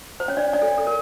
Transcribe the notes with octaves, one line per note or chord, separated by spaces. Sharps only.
C5
C#4 C#5
D4 D5
D4 D5
A4
A4
A#4